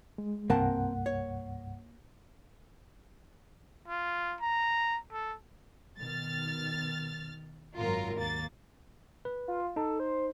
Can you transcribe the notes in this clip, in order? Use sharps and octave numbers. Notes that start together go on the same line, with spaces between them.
G#3
C2 G2 A#3 C4 A#4 F#5 A5
C#5
F4
A#5
A4
B2 D#3 F6 A6
G#1 F#2 F#3 F4 A#4 A#5
D#2 A#3 A6
B4
F4
D#4 A4
C5